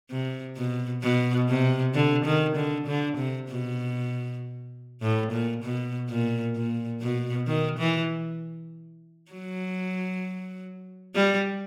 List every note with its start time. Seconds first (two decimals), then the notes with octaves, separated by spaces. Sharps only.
0.11 C3
0.57 B2
1.02 B2
1.49 C3
1.94 D3
2.25 D#3
2.56 D3
2.87 D3
3.17 C3
3.49 B2
5.02 A2
5.32 A#2
5.63 B2
6.09 A#2
6.56 A#2
7.02 B2
7.47 D#3
7.78 E3
9.32 F#3
11.15 G3